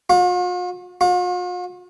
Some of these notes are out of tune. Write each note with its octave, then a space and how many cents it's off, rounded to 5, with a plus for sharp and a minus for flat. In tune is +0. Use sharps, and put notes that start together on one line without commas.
F4 +45
F4 +45